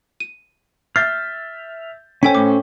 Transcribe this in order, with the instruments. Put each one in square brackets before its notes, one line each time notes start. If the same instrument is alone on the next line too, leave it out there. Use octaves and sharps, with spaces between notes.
[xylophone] D#7
[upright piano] E5 G6 A6 [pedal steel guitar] F6 [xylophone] C7
[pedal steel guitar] C#4 A4 C5 [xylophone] C#5 G5 B6 [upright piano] G#5
[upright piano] A2 [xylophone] D6